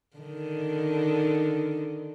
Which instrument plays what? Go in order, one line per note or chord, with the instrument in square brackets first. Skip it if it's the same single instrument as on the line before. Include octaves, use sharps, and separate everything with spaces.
[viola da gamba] D3 D#3